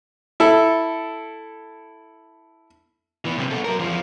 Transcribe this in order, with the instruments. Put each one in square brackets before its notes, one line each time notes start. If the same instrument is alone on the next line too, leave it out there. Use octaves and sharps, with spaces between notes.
[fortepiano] E4 A4
[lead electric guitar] E3 B3
B1 C3
B3 A4
F#3 A#4
E2 F3